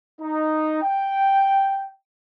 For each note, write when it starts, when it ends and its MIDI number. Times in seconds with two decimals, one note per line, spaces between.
0.21 0.80 63
0.82 1.87 79